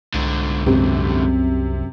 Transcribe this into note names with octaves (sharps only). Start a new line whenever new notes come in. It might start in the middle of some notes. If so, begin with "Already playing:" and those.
C2 G#2 D3
F#2 C3